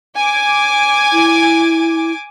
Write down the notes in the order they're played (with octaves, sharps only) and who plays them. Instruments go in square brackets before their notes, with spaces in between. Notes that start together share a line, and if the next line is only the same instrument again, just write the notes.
[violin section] G#5 D6
[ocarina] E4